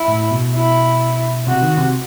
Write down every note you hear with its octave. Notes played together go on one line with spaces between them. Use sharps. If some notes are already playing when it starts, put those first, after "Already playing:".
Already playing: E4
A2
B2
E4
C3 F#4
D#3
C3